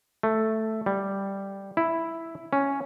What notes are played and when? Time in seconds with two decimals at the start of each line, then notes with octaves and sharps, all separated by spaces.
0.23 A3
0.86 G3
1.77 E4
2.53 C#4